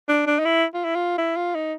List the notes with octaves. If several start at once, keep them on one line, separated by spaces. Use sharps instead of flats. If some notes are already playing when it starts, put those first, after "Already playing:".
D4
D4
D#4
E4
F4
E4
F4
E4
F4
D#4